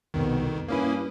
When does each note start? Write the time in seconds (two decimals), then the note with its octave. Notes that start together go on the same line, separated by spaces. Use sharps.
0.14 C2 F2 B2 D#3
0.68 G2 A#3 C#4 E4 B4 D#6